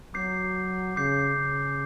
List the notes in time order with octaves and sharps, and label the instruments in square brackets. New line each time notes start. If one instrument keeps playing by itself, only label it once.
[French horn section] F#3 [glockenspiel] D6 G6 C7
[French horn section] C#3 [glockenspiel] D6 G6 C7
[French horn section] C#3